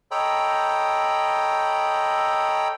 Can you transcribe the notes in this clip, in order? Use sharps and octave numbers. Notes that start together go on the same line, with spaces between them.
A4 C#5 D#5 G5 A#5 B5